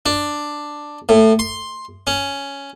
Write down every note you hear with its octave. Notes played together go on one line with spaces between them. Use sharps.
D4
A2
C6
C#4